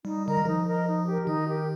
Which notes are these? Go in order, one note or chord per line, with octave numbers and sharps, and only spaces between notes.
G3 D#4
D3 A#4 D#5 A#5
D#3
F3 D#4
A#4 D#5 A#5
D#4
G4 A#4
D#3 D#4
G4 A#4